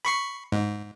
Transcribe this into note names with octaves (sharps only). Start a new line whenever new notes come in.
B5 C#6 C7
G#2